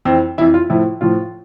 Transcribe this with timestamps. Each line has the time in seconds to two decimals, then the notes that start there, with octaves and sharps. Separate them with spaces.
0.05 F2 E3 C4
0.38 E3 E4
0.41 F2
0.54 F4
0.70 A2 F3 E4
1.01 A2 F3 F4